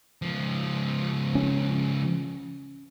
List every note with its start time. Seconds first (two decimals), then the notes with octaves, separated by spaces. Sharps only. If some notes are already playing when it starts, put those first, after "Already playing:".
0.22 C#2 F3
1.35 C#4